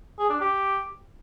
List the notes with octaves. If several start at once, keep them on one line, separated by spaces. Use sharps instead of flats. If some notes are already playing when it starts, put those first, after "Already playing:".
G#4
D4
G4